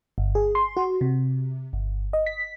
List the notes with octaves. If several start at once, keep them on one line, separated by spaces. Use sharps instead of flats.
G1
G#4
C6
F#4
C3
G1
D#5
B6